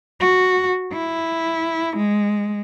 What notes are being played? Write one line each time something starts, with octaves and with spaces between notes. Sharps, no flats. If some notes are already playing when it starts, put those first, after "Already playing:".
F#4
E4
G#3